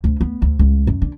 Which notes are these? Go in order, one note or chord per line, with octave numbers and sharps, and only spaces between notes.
D2
B3
D2
C#2
F#2
D3